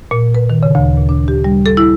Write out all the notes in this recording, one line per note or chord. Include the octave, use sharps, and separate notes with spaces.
A#2
B4
D#3
C#3
D2
A#2
D4
G4
G3
A4
E4